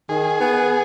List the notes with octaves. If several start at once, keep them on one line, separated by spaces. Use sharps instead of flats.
D#3 G#4
B3